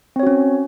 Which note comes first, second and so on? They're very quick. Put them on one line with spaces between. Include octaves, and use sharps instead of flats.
C4 C#5 F#4 C#4